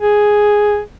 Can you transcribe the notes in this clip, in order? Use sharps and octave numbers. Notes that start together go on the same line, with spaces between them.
G#4